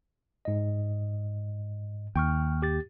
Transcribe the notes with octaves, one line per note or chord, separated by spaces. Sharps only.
G#2 D#5
D#2 G5 C#6 F6
G4 A6